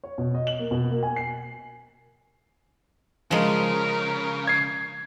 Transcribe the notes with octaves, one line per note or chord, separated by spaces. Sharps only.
C#5
B2
D#5
F#7
A#3
B2
A#3
G#5
C7
C#3 F3 G#3 A#4
G#6 C7